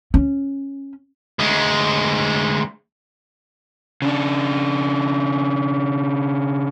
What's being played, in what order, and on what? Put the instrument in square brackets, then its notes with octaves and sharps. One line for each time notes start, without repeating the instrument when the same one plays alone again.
[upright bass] C#4
[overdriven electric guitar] D2 G#3
[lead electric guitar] C#3 D4